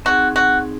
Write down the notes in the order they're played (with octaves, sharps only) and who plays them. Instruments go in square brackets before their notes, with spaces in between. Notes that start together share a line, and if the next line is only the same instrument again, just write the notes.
[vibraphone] C4 D#4 G#4 [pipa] F#4
[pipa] F#4